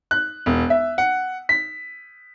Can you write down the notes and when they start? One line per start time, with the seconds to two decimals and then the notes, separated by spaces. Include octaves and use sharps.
0.11 F#6
0.46 E1
0.70 E5
0.98 F#5
1.49 B6